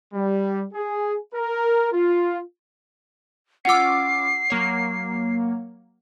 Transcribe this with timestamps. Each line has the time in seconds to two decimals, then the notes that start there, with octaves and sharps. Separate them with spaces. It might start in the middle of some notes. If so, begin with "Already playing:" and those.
0.14 G3
0.74 G#4
1.34 A#4
1.92 F4
3.65 C#4 F4 F#5 D6 E6 C7
4.50 F#3 A#3 C#5